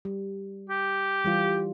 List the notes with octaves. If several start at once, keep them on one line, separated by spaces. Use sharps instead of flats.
G3
G4
E3 G3 F4